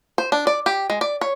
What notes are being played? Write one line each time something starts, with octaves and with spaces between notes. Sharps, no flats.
C5
D4
D5
G4
G#3
D5
C#5